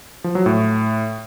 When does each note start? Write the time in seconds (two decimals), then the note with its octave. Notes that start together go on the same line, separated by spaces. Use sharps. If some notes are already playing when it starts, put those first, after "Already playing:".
0.24 F3
0.35 F#3
0.46 A2